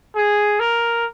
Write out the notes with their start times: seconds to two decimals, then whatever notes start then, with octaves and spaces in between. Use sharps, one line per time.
0.16 G#4
0.60 A#4